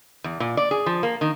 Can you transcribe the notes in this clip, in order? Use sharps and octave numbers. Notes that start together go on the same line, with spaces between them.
E2
A#2
D5
G#4
F3
A#3
D#3